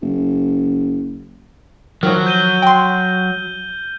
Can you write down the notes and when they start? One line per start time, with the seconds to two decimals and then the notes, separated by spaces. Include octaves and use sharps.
0.02 F#1
2.03 D#3 F3 F#3 F6
2.26 G6 D#7 G7
2.62 G5 C6